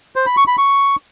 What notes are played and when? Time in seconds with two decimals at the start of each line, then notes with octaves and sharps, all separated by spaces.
0.16 C5
0.26 B5
0.37 C#6
0.47 B5
0.58 C#6